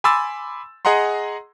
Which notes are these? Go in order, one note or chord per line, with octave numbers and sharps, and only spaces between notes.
G#5 B5 C6 D6 E6 A6
G#4 D#5 F#5 A#5 C6